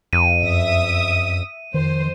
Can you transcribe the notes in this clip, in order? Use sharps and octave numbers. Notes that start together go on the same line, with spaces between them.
F2 D#7
F#2 E5 D#6
F2 D#3 C5